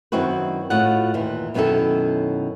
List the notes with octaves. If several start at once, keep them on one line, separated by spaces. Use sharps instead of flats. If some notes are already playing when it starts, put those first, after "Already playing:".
F#2 D#3 C4 E4 F#4 B4
A2 F4 F#4 D#5 F#5
D#2 A#2 E3
F#2 B2 D#3 C#4 E4 A4